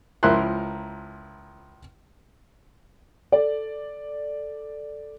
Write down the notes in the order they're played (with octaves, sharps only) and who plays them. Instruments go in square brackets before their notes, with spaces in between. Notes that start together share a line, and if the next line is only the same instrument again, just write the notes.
[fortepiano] C#2 F3 E4 A#4 C6 F#6
[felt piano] A4 D5